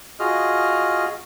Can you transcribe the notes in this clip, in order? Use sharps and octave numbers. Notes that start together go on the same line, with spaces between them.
F4 F#4 G#4 D#5 F6